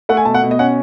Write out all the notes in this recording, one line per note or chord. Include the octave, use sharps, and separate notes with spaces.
A3 F#5
G#5
B2 A5
F#5
B2
D#5
C#4 F#5